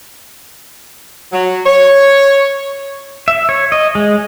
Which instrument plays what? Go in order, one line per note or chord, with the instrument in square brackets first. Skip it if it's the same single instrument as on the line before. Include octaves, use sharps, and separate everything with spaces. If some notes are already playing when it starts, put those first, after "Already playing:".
[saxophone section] F#3
C#5
[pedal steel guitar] E5
C#5
D#5
G#3